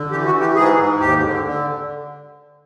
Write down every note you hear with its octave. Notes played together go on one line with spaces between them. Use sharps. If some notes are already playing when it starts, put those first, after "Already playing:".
Already playing: D3
E3 G4
F#4
E3
G4
G#2 G#4
G#2
D#2 G4
D3
D3